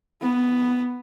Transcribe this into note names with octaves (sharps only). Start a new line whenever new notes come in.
B3